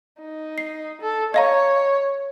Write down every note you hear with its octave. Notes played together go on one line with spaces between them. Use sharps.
D#4
C7
A4
C#5 D#5 F5 A#5